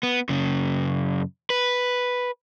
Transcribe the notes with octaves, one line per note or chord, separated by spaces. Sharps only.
B3
F#2 C#3
B4